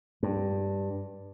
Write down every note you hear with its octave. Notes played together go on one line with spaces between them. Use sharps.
G2